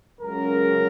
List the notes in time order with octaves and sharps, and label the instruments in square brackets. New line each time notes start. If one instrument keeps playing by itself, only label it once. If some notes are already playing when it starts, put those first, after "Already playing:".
[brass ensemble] C#2 C#3 F#3 A#4